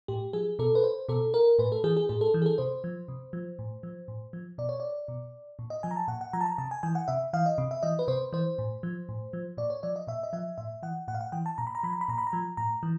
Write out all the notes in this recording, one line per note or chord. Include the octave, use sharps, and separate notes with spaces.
A2 G4
F3 G#4
B2 A4
B4
C5
B2 A4
A#4
A2 B4
A4
E3 G#4
G#4
A2 G#4
A4
E3
G#4
A4
C3 C5
F3
C3
F3
A2
F3
A2
F3
B2 D5
C#5
D5
B2
A#2
D#5
F3 G#5
A#5
A5
A#2 F#5
F#5
F3 A#5
A5
A#5
C3 A5
G#5
E3 G#5
F#5
C3 E5
E3 F5
D#5
C3
E5
E3 D#5
B4
C3 C5
E3 C5
A2
F3
A2
F3
A#2 D5
C#5
F3 D5
D#5
A#2 E5
D#5
F3 E5
A2 E5
E3 F#5
A2 F#5
F5
F#5
E3 G5
A5
A#2 A#5
B5
A#5
F3 B5
A#5
B5
A#2 A#5
B5
A#5
F3
A2 A#5
E3